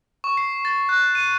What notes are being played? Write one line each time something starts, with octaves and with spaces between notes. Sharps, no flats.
C#6
C7
A6
F#6
D#7